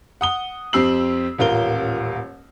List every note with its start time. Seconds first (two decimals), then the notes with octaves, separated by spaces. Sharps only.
0.21 F#5 D#6 G7
0.73 F2 C4 G4 E6 C7 F#7
1.38 D#1 A1 F4 A#4 G7